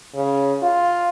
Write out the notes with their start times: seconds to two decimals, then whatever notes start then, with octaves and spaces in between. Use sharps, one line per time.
0.15 C#3
0.63 F4